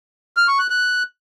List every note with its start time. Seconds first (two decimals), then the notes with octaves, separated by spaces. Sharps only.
0.37 F6
0.48 C#6
0.59 F#6
0.70 F#6